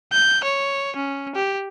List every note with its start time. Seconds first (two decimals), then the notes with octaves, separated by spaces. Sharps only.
0.12 G6
0.44 C#5
0.96 C#4
1.35 G4